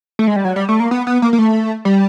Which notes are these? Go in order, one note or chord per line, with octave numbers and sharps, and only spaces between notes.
A3
G#3
G3
F#3
G3
A3
A#3
B3
B3
A#3
A#3
A3
G3